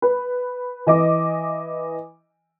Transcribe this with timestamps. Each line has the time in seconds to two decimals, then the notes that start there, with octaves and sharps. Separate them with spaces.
0.02 B4
0.87 E3 D#5 D6